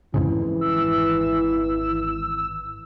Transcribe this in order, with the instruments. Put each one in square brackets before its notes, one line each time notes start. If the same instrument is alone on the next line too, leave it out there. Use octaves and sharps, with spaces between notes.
[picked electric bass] F2 G#2 C#3 [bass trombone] E3
[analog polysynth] G#1 E6